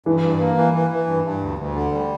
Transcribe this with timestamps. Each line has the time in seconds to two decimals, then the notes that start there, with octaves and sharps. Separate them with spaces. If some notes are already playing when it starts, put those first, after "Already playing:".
0.06 G2 E3
0.23 G2
0.40 A#3
0.57 E3
0.74 E3
0.91 E3
1.07 G2
1.25 G2
1.41 D2
1.58 D2
1.75 D3
1.92 G3